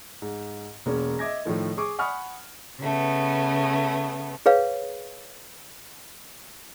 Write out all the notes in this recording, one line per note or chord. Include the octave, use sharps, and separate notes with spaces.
G#2
E1 A#3 C#4
D#5 E5 D6 G#6 A#6
A2 D#3 F3 A3
G#4 C#6 D6
F#5 G#5 B5 C#6 D#6 F6
C#3 A3 B3
G#4 B4 C#5 F5